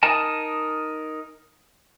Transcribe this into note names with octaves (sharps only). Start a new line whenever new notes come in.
D#4 A#4 D#5 G#5 A5